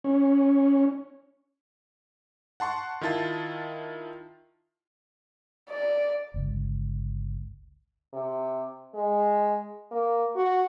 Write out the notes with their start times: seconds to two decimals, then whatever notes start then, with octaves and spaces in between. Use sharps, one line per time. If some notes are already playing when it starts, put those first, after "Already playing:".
0.04 C#4
2.60 F#5 A5 C6 C#6
3.01 D#3 E4 F4 A5 A6
5.70 D5
6.34 G1 C#2
8.13 C3
8.94 G#3
9.91 A#3
10.36 F#4